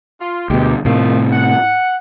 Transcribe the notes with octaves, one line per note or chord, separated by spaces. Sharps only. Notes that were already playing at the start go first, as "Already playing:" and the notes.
F4
D2 B2 G#3 G4
A2 C3 D#3 F3 A3
F#5